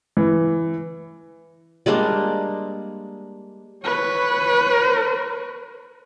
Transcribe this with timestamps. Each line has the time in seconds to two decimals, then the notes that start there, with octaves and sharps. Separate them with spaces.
0.17 E3
1.86 G3 G#3 A#3 D4
3.84 B4 C#5